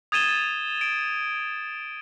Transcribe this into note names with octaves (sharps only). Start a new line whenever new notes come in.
D#6 G#6 A6 D#7 E7 G7
A6
D7